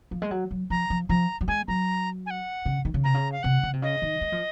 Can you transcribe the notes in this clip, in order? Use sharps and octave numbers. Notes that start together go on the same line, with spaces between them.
F3
G#3
F#3
F#3
F3 A#5
F3
F3 A#5
F#3
G#3 G#5
F#3 A#5
G#5
F#5
C#3
D#3
C#3
C3 A#5
C#3
F5
C3 F#5
C#3
C3
C#3 D#5
D#3
G#3
F3